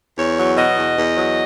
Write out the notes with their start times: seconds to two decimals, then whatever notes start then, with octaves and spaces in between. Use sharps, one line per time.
0.18 E2 C#5
0.38 F#3
0.57 B2 D#5
0.77 E2
0.97 E2
1.16 F#3